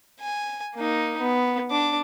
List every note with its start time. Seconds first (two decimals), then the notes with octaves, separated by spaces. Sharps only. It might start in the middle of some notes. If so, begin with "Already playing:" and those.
0.21 G#5
0.75 A#3 D#4
1.21 B3
1.71 D4 D6